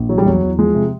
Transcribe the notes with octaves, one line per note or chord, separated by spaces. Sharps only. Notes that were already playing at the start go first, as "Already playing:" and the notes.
Already playing: A#1
E3 F#3
G3
E2 F#3
E2
F3 G#3
C3